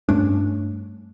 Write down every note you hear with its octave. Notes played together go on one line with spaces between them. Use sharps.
G2 A3 C#4 D4